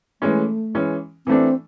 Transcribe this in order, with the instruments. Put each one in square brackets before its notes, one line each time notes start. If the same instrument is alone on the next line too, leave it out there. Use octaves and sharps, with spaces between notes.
[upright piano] E3 G#3 C#4 [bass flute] A3
[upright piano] E3 G#3 C#4
[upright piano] E3 A3 D4 [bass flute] C4